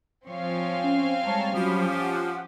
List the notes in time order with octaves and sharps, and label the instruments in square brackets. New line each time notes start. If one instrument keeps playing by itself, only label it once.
[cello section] F3 C#5 [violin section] C4 F5 G#5
[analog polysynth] C#4
[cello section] G3 G#3 C#5 [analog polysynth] A5 A#5
[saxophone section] F3 [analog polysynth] F#3 B5 [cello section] C#4 G4
[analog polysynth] F#5